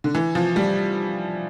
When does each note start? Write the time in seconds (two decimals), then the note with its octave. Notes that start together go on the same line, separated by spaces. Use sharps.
0.04 D3
0.15 E3
0.35 F3
0.56 G3